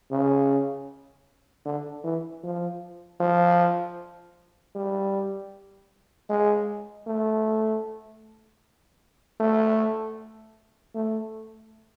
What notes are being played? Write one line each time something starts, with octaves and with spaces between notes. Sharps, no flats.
C#3
D3
E3
F3
F3
G3
G#3
A3
A3
A3